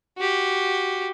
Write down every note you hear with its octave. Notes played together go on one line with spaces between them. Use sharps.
F#4 G4